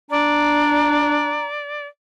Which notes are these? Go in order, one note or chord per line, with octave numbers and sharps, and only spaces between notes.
D4 D5 A#5